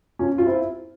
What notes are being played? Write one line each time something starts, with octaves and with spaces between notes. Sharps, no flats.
C#4 F4
F4
C4 E4